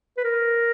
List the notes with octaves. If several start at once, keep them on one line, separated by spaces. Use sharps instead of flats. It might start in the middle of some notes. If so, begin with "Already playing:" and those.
B4
A#4